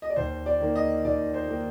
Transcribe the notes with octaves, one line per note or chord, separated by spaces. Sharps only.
D#5
D5
D#2 C5
D5
D#3 A#3
D#5
D#2 D5
C5
D#3 A#3